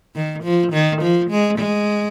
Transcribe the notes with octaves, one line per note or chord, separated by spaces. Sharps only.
D#3
F3
D#3
F3
G#3
G#3